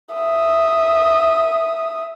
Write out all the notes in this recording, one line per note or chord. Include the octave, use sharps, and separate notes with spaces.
E5 D#6